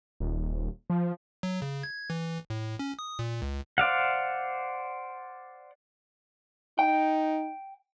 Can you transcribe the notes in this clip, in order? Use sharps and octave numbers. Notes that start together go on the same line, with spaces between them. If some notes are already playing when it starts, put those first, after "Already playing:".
D#1
F3
F#3
C#3
G#6
E3
A2
C#4
D#6
A#2
C#2
C5 D5 F5 F#5
D#4 G5